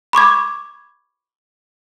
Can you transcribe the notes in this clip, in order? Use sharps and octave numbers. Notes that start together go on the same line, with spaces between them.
B5 C#6 D6 G#6